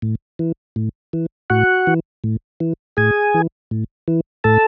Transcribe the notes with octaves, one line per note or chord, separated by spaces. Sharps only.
A2
E3
A2
E3
A2 F#4 F#5
E3
A2
E3
A2 G#4 G#5
E3
A2
E3
A2 A4 A5